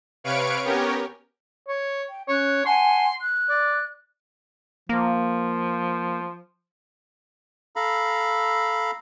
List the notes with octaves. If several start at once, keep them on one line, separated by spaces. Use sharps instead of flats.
C3 B4 C#5 F5 C#6 D7
B3 C#4 G4 A#4 C#5
C#5
G5
C#4 C#5 F#6
F#5 G#5 A5 C6
F#6
D5
F3 A#3
A4 F5 A#5 B5